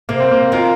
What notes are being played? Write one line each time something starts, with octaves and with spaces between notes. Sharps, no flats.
C3 A#3
C4
A#3
D#3 F4 A#4